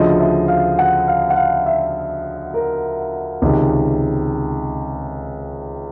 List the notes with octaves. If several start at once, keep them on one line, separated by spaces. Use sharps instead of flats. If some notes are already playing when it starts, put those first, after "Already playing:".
Already playing: D2 C#3 F3 D#5
E5
F5
F#5
F5
F#5
F5
E5
A#4
C#2 C3 D#3